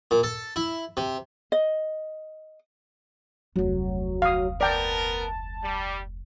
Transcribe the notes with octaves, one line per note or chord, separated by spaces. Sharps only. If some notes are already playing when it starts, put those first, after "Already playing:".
A#2
A4
E4
C3
D#5
F1 D2 F#3
F5 D#6
B3 A#4 D5 G5 A5
G3